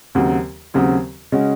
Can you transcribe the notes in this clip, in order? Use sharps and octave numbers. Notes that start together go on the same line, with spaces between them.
D#2 C#3 F#3 C4 F#4
D#2 C#3 F#3 C4 F#4
C#3 G#3 C#4 F#4